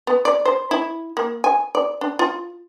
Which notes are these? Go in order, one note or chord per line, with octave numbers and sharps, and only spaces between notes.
B3
D5
C5
E4
A#3
G#5
D5
D4
F4